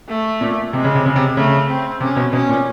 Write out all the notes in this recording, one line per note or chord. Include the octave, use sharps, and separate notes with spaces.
A3
A#2
C3 G#3
C#3
C3
C#3
C3
C#3 A3
C4
C3 C#4
B2
B2 C#4
A#2